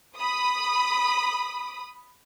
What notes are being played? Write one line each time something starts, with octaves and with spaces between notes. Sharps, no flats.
B5 D#6